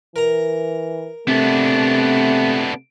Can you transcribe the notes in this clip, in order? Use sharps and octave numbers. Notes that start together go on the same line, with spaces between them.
E3 A#4 A#5
C3 A3 B3 D4